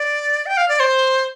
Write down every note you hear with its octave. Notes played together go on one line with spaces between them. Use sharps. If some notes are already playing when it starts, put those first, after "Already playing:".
Already playing: D5
G5
F5
D5
C5